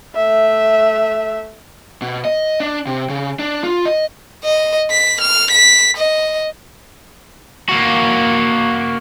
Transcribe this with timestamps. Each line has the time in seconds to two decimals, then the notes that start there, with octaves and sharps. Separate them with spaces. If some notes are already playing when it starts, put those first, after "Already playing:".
0.15 A3 E5
2.02 B2
2.25 D#5
2.60 D4
2.87 C3
3.09 C#3
3.39 D4
3.64 F4
3.85 D#5
4.44 D#5
4.91 B6
5.21 F6
5.51 B6
5.97 D#5
7.69 A#3 F#4